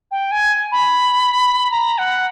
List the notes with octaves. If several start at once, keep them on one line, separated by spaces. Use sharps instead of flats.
G5
G#5
B5
A#5
F#5